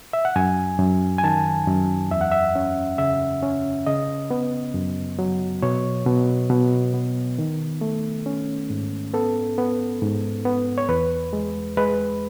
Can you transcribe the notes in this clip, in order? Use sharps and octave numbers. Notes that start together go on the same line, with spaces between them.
E5
F#5
F#2 G#5
F#2
G#5
D#3 A5
F#2
E2 E5
F#5
E5
C#4
C#3 E5
C#4
C#3 D#5
B3
F#2
F#3
B2 C#5
B2
B2
B3
D#3
A3
C#4
G#2
B3 A4
B3
G#2
B3
C#5
E2 B4
G#3
G#3 B4